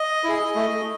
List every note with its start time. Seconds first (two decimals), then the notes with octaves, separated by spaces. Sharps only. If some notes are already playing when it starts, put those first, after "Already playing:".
Already playing: D#5
0.24 E4 G#4
0.55 A3